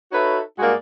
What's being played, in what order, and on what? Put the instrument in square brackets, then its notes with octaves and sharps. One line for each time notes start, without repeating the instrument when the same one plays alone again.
[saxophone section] D#4 F#4 A4 B4 C#5 E5
G2 G#3 A#3 F#4 G#4 D5